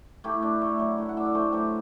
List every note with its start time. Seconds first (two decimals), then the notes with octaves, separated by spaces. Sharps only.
0.24 A3 E4 G4
0.42 D4
0.62 A3
0.80 F#3
0.98 A2
1.09 F#5
1.17 D4 E5
1.25 D5
1.34 A3 A4 C5
1.52 F#3 G4 B4